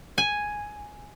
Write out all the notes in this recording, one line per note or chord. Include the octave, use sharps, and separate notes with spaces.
G#5